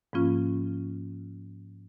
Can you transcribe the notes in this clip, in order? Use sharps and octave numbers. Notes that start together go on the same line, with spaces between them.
G#2 F3 A#3 C#4 F4